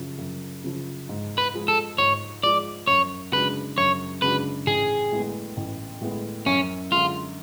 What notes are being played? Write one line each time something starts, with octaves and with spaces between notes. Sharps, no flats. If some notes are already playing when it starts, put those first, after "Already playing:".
Already playing: F#2 C#3 F3
F#2
C#3 F3
G#2
B4
F3 G#3
A4
G#2 C#5
F3 G#3 D5
F#2 C#5
C#3 G#3 D4 F#4 B4
F#2 C#5
C#3 G#3 D4 F#4 B4
A1 G#4
A2 G#3 B3
A1
A2 G#3 B3
F#2 C#4
D3 G#3 F4